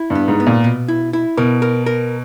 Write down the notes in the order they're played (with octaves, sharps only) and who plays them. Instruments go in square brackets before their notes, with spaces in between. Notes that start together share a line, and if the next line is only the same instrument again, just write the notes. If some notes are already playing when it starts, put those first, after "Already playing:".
Already playing: [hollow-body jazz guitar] E4
[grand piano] G2
[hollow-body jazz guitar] B3
[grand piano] G#2
[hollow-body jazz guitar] B3
[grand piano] A#2
[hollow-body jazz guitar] B2
E4
E4
[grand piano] B2 [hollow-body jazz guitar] A#4
[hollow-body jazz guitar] A#4
A#4